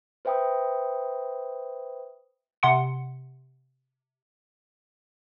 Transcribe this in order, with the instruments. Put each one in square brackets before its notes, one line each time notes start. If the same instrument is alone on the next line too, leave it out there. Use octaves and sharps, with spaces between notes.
[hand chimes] B4 C5 E5 G5 B5 D#6
[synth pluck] C3 F#5 C6 C#7